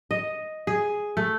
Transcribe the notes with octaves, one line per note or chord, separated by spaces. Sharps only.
D#5
G#4
A3